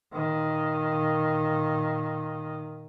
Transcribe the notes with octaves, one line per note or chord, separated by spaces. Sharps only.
A#2 D#3